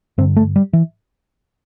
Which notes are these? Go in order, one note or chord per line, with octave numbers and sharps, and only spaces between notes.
G2 D3 C4
A3
G3
E3